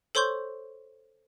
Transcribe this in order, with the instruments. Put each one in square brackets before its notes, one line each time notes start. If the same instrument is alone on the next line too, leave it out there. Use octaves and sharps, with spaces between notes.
[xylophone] A4 C5 C#5 C6 C#6 G6